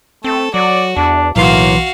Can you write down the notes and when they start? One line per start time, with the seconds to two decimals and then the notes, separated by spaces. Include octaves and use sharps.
0.24 A3 C4 A4
0.54 F#3 F#4 D5
0.97 E2 D4
1.36 B1 A2 E3 A#3 F#4 F5 C6